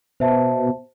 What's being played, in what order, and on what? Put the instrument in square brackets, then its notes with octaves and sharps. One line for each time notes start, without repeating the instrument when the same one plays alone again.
[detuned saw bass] B2 [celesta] C5 E5 A5